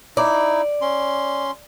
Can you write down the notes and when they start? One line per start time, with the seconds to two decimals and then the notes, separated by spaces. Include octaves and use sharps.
0.17 D#4 E4 D5
0.81 C#4 C6